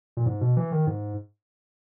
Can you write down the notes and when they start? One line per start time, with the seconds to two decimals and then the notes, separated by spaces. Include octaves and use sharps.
0.17 A#2
0.26 G#2
0.41 B2
0.57 E3
0.72 D#3
0.87 G#2